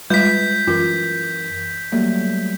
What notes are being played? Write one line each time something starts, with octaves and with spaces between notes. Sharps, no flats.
G3 G#3 F4 B4 G6 B6
F#2 E3 F4 A#4
F#3 G3 A3 A#3